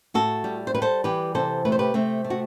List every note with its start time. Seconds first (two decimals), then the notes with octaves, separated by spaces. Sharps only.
0.14 A2 F#4 A4
0.44 G3
0.67 C5
0.74 G3 B4
0.82 A4 C5
1.04 E3 G4 B4
1.35 C3 A4 C5
1.65 A3 B4
1.72 C5
1.79 G4 B4
1.94 C3 A3 C4
2.24 A3
2.30 F#4